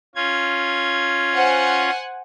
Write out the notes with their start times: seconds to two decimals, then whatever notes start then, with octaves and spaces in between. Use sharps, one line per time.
0.15 C#4 F4 G#6
1.33 C5 F#5 G#5